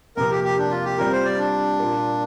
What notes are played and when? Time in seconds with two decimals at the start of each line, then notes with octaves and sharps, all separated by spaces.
0.17 F2 C3 A#3 A#4
0.31 G4
0.44 G4
0.58 D4
0.71 F4
0.85 G4
0.98 G3 C4 F4 A#4
1.12 C5
1.25 D5
1.38 D4
1.80 A#2 A#3 F4 D5